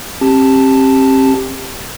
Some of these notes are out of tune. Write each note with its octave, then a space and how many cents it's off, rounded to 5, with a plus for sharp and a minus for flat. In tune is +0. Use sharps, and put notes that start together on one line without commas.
C4 +35 G4 +5 A5 +0